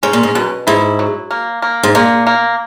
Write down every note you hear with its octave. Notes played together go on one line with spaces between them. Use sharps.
G#2 C#4
A#2
G#2
F#2 B2
G#2 E4
F#3
A#3
A#3
G#2
A#2 A#3
A#3